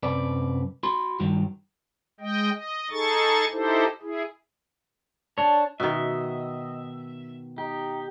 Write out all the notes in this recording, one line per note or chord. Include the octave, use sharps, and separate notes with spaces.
F#2 C3 B4 D5
F#4 B5 C6
G2 D#3 F#3
G#3 D#5 G5
D#5
D#4 G#4 A4 C#6 A6
D#4 E4 G4 A4 C5
E4 G#4
D4 C#5 A5
B2 D#3 D#5 E5
D#4 G4